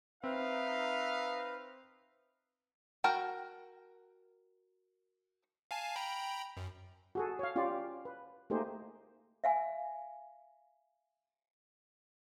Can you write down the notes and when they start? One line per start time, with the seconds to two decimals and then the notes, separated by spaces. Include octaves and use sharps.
0.24 C4 D#4 B4 E5 F5
3.04 F#4 A#4 G5 A5
5.71 F5 G#5 A5
5.96 G5 A#5 B5
6.57 F#2
7.15 F#4 G#4 A4
7.39 C#5 F5
7.56 C#4 F4 G4 D5
8.05 B4
8.50 A3 A#3 D#4 G4 G#4 C5
9.44 E5 F5 G#5